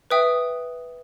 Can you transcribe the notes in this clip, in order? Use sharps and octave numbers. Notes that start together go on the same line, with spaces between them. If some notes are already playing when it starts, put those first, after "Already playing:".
B4 E5 G5 D#6